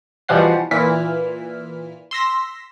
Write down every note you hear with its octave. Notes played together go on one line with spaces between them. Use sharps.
B2 E3 F3 G3 F#5 C7
A#2 E3 E4 F6 B6
C6 E6 A#6 B6